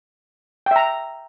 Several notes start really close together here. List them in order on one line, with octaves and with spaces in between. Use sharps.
G5 E5 A#5